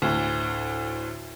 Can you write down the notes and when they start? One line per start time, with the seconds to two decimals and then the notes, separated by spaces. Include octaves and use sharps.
0.02 D2 A2